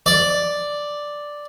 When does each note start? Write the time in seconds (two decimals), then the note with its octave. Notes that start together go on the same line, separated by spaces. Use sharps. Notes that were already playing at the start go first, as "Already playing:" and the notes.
0.06 D5